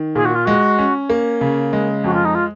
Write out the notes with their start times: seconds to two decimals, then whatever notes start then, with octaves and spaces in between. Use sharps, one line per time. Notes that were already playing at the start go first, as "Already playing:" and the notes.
Already playing: D#3
0.15 A#2 G#4
0.25 F#4
0.35 F4
0.45 G#3 F#4
0.78 C#4
1.10 A#3
1.41 C#3
1.73 G#3
2.04 F2 F#4
2.14 F4
2.25 D#4
2.35 F4